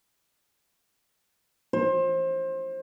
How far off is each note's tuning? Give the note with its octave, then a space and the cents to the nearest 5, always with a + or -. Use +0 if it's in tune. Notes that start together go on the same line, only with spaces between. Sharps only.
C5 +25